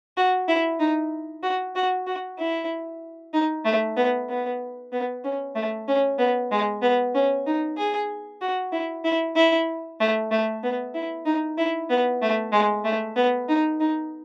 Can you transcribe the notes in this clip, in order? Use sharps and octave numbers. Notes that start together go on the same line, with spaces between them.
F#4
E4
D#4
F#4
F#4
F#4
E4
D#4
A3
B3
B3
B3
C#4
A3
C#4
B3
G#3
B3
C#4
D#4
G#4
F#4
E4
E4
E4
A3
A3
B3
E4
D#4
E4
B3
A3
G#3
A3
B3
D#4
D#4